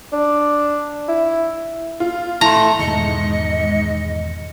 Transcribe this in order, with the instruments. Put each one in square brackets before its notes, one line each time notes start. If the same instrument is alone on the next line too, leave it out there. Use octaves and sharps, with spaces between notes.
[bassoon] D4
E4
[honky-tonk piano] F4
[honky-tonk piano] A2 [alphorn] A3 [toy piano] A5 C6 [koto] A#5
[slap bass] E2 B2 D#3 [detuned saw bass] G#2 [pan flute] D#5 [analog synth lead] C#7